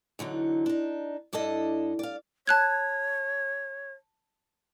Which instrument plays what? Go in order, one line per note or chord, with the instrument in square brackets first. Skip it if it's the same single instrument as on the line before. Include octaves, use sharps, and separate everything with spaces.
[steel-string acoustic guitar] E2 D3 F#3 D#4
D4 D#4
G2 D4 E4 A4 D#5
D5 F5
[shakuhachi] C#5 [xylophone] A5 F#6 G#6